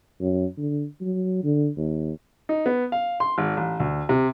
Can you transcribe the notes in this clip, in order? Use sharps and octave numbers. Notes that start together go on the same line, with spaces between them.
F#2
D3
F#3
D3
D#2
D#4
B3
F5
C6
G#1
A1
D2
C3